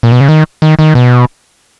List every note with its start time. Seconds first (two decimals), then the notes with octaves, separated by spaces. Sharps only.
0.03 A#2
0.12 B2
0.21 C#3
0.29 D#3
0.62 D#3
0.79 D#3
0.95 B2